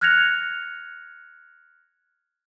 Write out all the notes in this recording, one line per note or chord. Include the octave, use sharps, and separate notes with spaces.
F6 F#6 G#6 A#6 C#7 F7